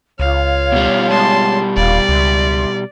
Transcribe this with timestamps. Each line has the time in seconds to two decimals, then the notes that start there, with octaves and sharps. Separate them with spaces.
0.19 C#2 F4 C#5 F5
0.72 B2 G3
1.11 G#3 A5 C6
1.76 D#1 F4 D5 F5 B5
2.09 C#2 E5 C6